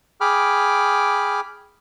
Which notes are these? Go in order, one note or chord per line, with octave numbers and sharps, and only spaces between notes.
G#4 G5 B5 D6 F6